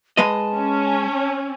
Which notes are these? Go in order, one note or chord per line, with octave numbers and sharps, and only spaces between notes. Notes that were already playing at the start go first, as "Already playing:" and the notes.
G#3 B4 D#5 A5
C#4